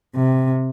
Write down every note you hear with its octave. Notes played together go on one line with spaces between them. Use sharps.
C3